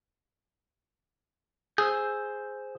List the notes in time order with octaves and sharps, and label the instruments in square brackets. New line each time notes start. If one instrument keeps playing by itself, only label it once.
[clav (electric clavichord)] G#4 [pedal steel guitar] C5 E6 G6